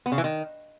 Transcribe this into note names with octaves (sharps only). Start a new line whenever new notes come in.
B3
C#3
E3
D#3